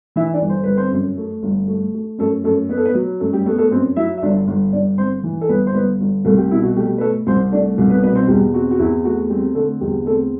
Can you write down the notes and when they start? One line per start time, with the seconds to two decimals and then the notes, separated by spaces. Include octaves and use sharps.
0.16 E3 E4 E5
0.33 D4 D5
0.41 G1
0.49 C5
0.64 G1 B4
0.77 C4 C5
0.92 F#2
1.17 A3
1.43 G1
1.68 A3
1.94 A3
2.19 F#2 A3 A4
2.44 F#2 A3 A4
2.69 B3 B4
2.77 A4
2.85 B3 B4
2.95 F#3
3.20 F#2 A3 A4
3.33 G3 G4
3.46 A3 B3 A4
3.58 A3 A4
3.71 F#2 C4 C5
3.96 F#3 E4 E5
4.18 E5
4.22 G1 D4 D5
4.48 G1
4.72 G1 D4 D5
4.98 G1 C4 C5
5.24 E3
5.41 A4
5.49 G1 B3 B4
5.67 C5
5.74 G1 B3 B4
6.00 G1
6.25 C2 A3 A4
6.38 G3 G4
6.51 B2 E4
6.63 F#4
6.76 G3 A3 G4
6.98 B4
7.01 A3 A4
7.26 C2 C4 C5
7.52 A3 D4 D5
7.78 C2
7.90 B3 B4
8.03 B2 B3 B4
8.15 C4 C5
8.28 E2 G3 G4
8.54 C4 F#4
8.71 F#4
8.79 E2 E4
9.05 A3 F#4
9.29 G3 C4 G4
9.55 D3 A3 A4
9.80 E2 G3 G4
10.06 A3 C4 A4